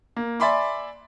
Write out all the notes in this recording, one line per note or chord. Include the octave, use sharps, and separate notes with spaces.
A#3
D5 E5 G#5 B5 C6 D6